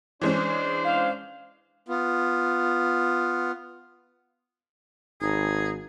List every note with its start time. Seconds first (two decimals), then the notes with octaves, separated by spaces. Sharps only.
0.21 E3 G#3 C#4 D4 C5
0.85 F5
1.89 B3 F4
5.21 G#1 D#4 G#4